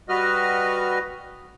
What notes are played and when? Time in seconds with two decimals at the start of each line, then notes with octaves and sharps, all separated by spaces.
0.09 G3 F#4 B4 D#5 F6